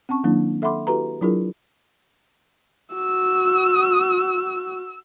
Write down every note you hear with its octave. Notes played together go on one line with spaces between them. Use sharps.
C4 C#4 A5 C#6
D#3 F#3 A#3 D4 E4
A4 E5 F#5 B5 C6 D6
E4 F#4 G4 A4 B4 A#5
F#3 D4 E4 F4 G#4 A#4
F#4 E6